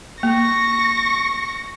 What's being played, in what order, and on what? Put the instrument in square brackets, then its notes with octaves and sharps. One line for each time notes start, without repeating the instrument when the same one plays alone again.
[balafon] A#3 [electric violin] C#6 A#6